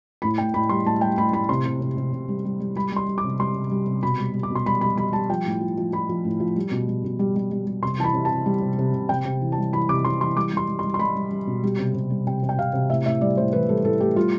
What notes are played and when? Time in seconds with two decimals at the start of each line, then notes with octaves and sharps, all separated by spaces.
0.22 A2 B5
0.38 A2 G5
0.54 A2 B5
0.69 G3 C6
0.86 A2 A5
1.01 G3 G5
1.18 A2 B5
1.33 A2 B5
1.49 C3 C6
1.66 C3
1.81 C3
1.97 C3
2.13 C3
2.28 G3
2.45 G3
2.60 G3
2.76 G3 B5
2.92 G3 C6
3.08 G3
3.18 D6
3.24 C3
3.39 G3 C6
3.56 C3
3.71 G3
3.86 C3
4.03 B2 B5
4.19 G3
4.34 G3
4.43 D6
4.50 B2
4.55 C6
4.66 G3 B5
4.81 G3 B5
4.97 G3 B5
5.13 G3 A5
5.29 F3 G5
5.46 A2
5.61 F3
5.78 F3
5.93 F3 B5
6.09 F3
6.25 A2
6.40 F3
6.56 G3
6.71 B2
6.88 G3
7.04 B2
7.19 G3
7.36 G3
7.51 G3
7.67 G3
7.82 C3 C6
7.99 E3 A5
8.04 B5
8.14 C3
8.25 A5
8.30 C3
8.46 G3
8.62 C3
8.79 C3
8.94 C3
9.09 C3 G5
9.25 C3
9.41 E3
9.52 A5
9.58 G3
9.73 E3 B5
9.89 C3 D6
10.05 C3 C6
10.21 E3 C6
10.36 G3 D6
10.53 G3 C6
10.68 G3
10.79 C6
10.84 G3
10.94 C6
10.99 G3 B5
11.15 G3
11.31 G3
11.47 B2
11.64 G3
11.78 C3
11.94 C3
12.10 G3
12.27 C3 G5
12.43 C3
12.49 G5
12.59 C3 F5
12.73 C3
12.90 A2 E5
13.06 A2 E5
13.21 G3 D5
13.38 A2 C5
13.53 E3 B4
13.69 G3 A4
13.84 A2 A4
14.00 A2 G4
14.16 G3 F4